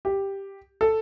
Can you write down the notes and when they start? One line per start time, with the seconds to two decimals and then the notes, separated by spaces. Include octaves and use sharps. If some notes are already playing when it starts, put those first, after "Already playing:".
0.05 G4
0.81 A4